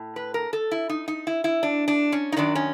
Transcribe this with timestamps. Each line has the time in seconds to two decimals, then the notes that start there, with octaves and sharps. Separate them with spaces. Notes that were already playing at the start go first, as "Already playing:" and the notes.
Already playing: A2
0.16 B4
0.34 A#4
0.53 A4
0.71 E4
0.90 D#4
1.08 D#4
1.27 E4
1.44 E4
1.63 D4
1.88 D4
2.12 C#4
2.32 D#4
2.37 F#2 D#3 D4
2.55 C#4